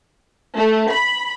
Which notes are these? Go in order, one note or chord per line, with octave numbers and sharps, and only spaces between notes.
A3
B5